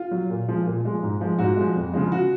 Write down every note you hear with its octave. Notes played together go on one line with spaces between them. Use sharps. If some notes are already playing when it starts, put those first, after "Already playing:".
Already playing: F4
F#3
A#2
F3 G#3
A#2
F3 G#3
G#2
F3 G#3
G#2 F#4
F3 G#3
F2
C#3 F3 G#3
F#4